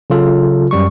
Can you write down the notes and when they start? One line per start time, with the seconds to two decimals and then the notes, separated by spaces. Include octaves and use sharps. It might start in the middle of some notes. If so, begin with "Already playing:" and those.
0.10 C#3 F#3 F4 A4
0.71 F#2 G3 C#6